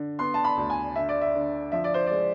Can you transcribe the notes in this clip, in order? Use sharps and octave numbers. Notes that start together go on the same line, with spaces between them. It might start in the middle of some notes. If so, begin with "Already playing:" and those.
Already playing: D3
B3 C6
A5
B5
D2
G#5
D3 E5
D5
E5
D3
F3 E5
D5
C5
G#3 D5